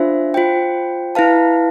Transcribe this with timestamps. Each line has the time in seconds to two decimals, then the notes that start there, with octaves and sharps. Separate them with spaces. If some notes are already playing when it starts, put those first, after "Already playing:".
Already playing: D4 F4 C5 E5
0.34 F4 C5 G5
1.15 E4 B4 F5 A5